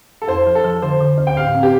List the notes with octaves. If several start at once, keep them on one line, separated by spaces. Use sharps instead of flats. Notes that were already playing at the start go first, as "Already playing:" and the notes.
A4
F2 C5
F3
A4
F3
D3 C5
D3
D2
G5
A2 F5
C4
G4